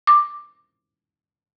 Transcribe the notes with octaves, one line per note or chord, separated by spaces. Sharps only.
D6